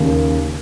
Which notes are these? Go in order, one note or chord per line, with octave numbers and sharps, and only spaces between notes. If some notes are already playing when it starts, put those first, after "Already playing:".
Already playing: D#2 C#3 A#3